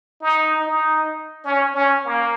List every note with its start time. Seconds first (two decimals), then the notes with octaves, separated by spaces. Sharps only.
0.21 D#4
0.67 D#4
1.44 C#4
1.74 C#4
2.05 A#3